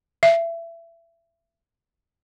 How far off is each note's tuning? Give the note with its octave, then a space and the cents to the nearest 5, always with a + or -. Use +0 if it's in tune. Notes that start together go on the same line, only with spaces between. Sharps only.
E5 +25